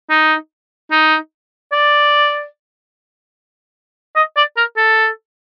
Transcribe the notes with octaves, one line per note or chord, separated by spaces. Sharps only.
D#4
D#4
D5
D#5
D5
A#4
A4